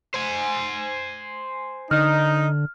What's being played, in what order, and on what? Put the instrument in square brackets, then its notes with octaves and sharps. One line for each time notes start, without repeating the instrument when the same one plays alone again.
[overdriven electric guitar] C5 G#5
[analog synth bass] D3 [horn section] D#4 [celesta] F6